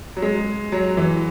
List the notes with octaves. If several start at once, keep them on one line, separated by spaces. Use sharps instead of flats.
F#3
G#3
F#3
E3